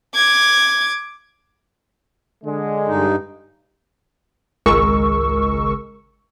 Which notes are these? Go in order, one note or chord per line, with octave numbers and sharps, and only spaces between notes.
D6 G#6
D3 G#3
G2 D#4
G#1 C#2 G#3 A#4 C#6 E6